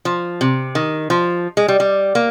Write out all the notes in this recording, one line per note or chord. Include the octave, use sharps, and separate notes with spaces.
F3
C3
D#3
F3
G#3
G3
G3
A#3